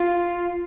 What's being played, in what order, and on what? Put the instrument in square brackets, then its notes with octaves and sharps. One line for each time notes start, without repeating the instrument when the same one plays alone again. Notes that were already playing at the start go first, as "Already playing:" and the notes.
Already playing: [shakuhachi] F4